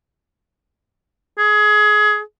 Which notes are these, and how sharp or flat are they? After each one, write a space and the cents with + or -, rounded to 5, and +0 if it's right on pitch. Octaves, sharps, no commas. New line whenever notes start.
G#4 +20